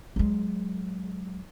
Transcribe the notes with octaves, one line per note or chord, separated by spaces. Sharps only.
F#3 G#3